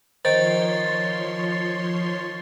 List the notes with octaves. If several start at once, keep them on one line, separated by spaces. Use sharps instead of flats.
D#3 F3 C5 C#5 C6 A6